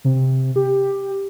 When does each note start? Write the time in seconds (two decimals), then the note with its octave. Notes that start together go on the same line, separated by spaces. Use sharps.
0.04 C3
0.56 G4